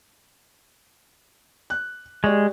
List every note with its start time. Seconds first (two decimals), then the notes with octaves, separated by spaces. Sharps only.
1.70 F#6
2.24 G#3 G4 D5 C#6